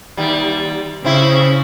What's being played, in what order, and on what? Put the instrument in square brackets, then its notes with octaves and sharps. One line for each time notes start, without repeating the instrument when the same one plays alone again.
[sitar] D#2 G3
[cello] C#3 [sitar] C4 E4